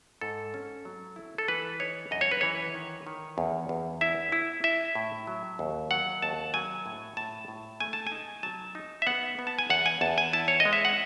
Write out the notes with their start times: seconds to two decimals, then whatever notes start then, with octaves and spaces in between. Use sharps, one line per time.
0.21 G#2 A4
0.54 C#4
0.85 F#3
1.16 E4
1.38 A4
1.48 E3 B4
1.80 D#4 C#5
2.11 F#2 D#5
2.21 C#5
2.31 B4
2.41 E3 C#5
2.74 D#3
3.07 D#3
3.38 E2
3.69 E2
4.01 E4 E5
4.32 E4
4.64 E4 E5
4.95 A2
5.27 F#3
5.59 D#2
5.91 F#3 F#5
6.22 D#2 A5
6.54 F#3 G#5
6.86 A2
7.17 A2 A5
7.48 A2
7.80 A3 G#5
7.93 A5
8.07 G#5
8.12 D#4
8.43 F#3 A5
8.75 D#4
9.02 E5
9.07 B3 F#5
9.39 B3
9.47 A5
9.59 G#5
9.70 E2 F#5
9.86 G#5
10.01 E2 A5
10.18 G#5
10.33 E4 A5
10.48 C#5
10.60 D#5
10.65 G#3
10.73 E5
10.85 F#5